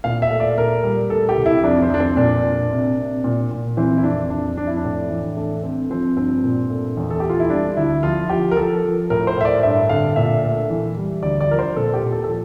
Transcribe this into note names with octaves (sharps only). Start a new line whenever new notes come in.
A#2 F5
E5
A3
D5
A#2 A#4
G3
A3 A4
G4
C2
E4
F2 D4
C4
F2 D4
C4
A#2 D4
A#2
C3
C3
A#2
A#2
E3 C4
E4
F2 D4
F2 D4
F2 D4
E4
D4
A2
E3
A3 D4
A3 C4
F3 C4
G2 C4
A#2
A3
E2
A4
A3 G4
F4
E4
G3 D4
D2 E4
F3 F4
F3 G4
A#4
F3 A4
F3
A2 A#4
C5
A2 E5
D5
G2 E5
D3 F5
A#2 E5
A3
E3
G3
D2 D5
D5
F3 A#4
C5
A#2 A4
G4
A#2
A4
A4
F3